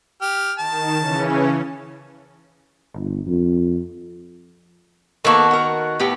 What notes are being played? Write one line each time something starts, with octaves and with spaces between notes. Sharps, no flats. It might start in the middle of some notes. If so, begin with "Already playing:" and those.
G4 F6
D#3 A5 E7
C#3 E3 C#4
G1
F2
D#3 A#3 B3 F#4 A4
A#4 F#5
A2 B3 G4